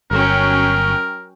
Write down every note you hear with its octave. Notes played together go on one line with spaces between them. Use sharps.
G1 F#3 C#4 A#4 G5